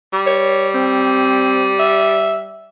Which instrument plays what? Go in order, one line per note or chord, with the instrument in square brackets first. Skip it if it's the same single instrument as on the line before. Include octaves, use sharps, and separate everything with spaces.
[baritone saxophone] G3
[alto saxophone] C#5
C4
E5